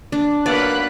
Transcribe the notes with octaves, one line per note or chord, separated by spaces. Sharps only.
D4
D#3 F#3 A#3 B3 D5 B5 F#6 B6